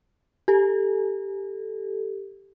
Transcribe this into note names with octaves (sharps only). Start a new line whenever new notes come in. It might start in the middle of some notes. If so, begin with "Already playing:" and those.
G4 A4